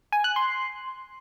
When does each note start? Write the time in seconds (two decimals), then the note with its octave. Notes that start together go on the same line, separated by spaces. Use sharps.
0.12 G#5
0.24 F#6
0.36 C6